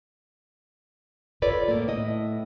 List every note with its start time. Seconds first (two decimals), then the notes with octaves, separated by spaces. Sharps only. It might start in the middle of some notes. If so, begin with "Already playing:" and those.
1.42 F4 A4 B4 C#5 D5
1.68 A2 A#3
1.87 A2 E4 D#5